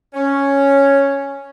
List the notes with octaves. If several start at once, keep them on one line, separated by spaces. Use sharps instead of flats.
C#4